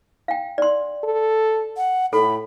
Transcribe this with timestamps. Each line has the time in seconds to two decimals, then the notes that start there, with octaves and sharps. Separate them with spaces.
0.28 F5 G5
0.58 D5 C6
1.04 A4
1.77 F#5
2.13 A2 A4 B5